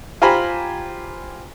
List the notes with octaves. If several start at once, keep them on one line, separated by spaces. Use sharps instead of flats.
F4 G4 C5 G#5 A#5 B5